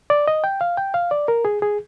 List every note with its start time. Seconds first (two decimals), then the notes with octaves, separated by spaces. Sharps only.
0.10 D5
0.28 D#5
0.44 G5
0.61 F5
0.77 G5
0.94 F5
1.11 D5
1.28 A#4
1.45 G#4
1.62 G#4